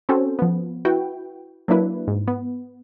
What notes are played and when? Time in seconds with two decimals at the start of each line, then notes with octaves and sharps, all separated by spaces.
0.09 C4 C#4 F#4 A4 C5
0.39 F3 B3
0.85 E4 F#4 B4 G5
1.68 F#3 A#3 D4 E4 B4
2.08 G#2
2.28 B3